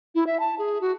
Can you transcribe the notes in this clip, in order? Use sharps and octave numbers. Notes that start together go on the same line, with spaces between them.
E4
E5
A5
G#4
F#4